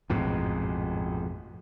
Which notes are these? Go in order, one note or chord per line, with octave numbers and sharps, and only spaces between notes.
A1 F2 G#2 B2